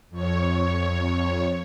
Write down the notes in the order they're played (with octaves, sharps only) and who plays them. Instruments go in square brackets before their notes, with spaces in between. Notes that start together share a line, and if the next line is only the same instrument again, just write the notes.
[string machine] F2 C#5